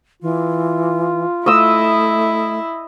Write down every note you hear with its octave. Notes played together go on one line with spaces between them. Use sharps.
E3 F4
A3 E4 D#5 E6